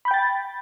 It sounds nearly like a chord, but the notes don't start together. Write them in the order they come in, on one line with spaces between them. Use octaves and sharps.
B5 G6 G5 A6